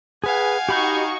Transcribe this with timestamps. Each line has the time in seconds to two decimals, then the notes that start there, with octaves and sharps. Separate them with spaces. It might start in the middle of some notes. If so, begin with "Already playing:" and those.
0.24 G#4 B4 F5 F#5 G#5
0.69 D#4 F#4 G4 B5 C#6 G6